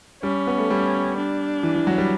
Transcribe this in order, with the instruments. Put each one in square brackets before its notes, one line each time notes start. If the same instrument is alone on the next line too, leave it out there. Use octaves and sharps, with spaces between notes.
[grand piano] G3 [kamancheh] C#4
[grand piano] B3
A3
G3
[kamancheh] D4
[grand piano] E3
E3
F#3
G3